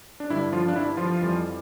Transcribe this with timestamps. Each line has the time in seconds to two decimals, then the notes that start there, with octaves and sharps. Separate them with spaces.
0.20 D4
0.30 G2 D3 G3 E4
0.52 F3 F4
0.68 D4
0.76 E4
0.97 F3 F4
1.20 F2 E3 G3